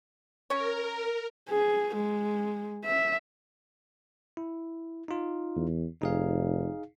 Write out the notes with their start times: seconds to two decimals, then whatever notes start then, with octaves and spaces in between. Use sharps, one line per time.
0.50 C#4 A#4 C#5
1.49 G#4
1.96 G#3
2.85 E5
4.37 E4
5.08 D#4 F4
5.56 E2
6.02 F1 D#4 G#4 F5